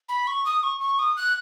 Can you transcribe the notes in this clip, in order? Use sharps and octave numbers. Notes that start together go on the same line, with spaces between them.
B5
C#6
D#6
C#6
C#6
D#6
F#6